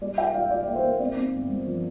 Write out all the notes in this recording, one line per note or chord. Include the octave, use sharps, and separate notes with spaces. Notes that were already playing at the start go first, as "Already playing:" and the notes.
G3 D5
F4 E5 G5
F4 D5 F5
F4 D5
D5
A#3
C5
A#3
C4 D5
C4
G1
G2
F3